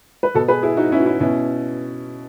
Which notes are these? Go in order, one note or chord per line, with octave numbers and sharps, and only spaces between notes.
B4
B2 F#4 A4
G#4 B4
E4 G#4
D#4 F#4
C#4 E4
F#4
C#4 E4
B2 C#4 E4